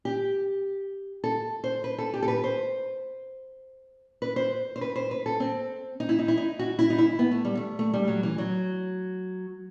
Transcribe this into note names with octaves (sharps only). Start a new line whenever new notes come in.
G4
A4
C5
B4
A4
G4
A4
B4
C5
B4
C5
C5
B4
C5
B4
A4
C4
D#4
E4
D#4
E4
D#4
F#4
E4
D#4
E4
B3
A3
G3
A3
A3
G3
F#3
E3
F#3